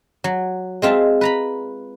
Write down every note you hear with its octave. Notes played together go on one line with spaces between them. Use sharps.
F#3
G#3 C4 F4 E5 A5
B4 A#5 B5